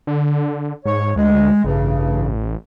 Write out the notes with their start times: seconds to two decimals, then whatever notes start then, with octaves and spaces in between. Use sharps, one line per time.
0.07 D3
0.85 G#2 C#5
1.16 D2 G#3
1.64 A1 G2 C#3